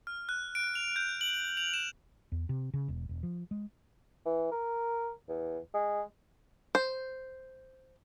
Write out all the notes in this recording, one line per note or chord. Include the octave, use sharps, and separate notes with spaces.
F6
F#6
D7
F7
G6
F#7
F7
E7
E2
C3
C#3
E1
E1
F3
G#3
E3
A#4
E2
G#3
C5